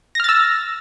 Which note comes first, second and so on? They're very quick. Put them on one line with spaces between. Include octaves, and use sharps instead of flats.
A#6 F6 A6 E6